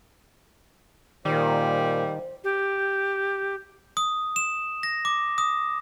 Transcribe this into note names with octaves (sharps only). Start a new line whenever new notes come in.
A#2 D#3 G3 C5
G4
D#6
E7
A#6
D6
D#6